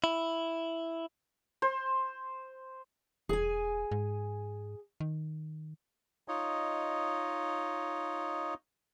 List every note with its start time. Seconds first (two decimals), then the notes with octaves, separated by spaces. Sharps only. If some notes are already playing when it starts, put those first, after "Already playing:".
0.04 E4
1.62 C5
3.29 E1 G#4 G#5
3.91 G#2
5.00 D#3
6.28 D#4 F4 C#5 D#5